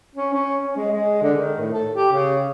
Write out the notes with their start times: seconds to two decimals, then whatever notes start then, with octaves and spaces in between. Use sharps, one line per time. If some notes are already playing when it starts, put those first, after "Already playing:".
0.15 C#4
0.33 C#4
0.62 C#4
0.77 G#3
0.91 G#3
1.22 D3
1.36 D#3
1.59 A2
1.73 A4
1.94 G4
2.13 C#3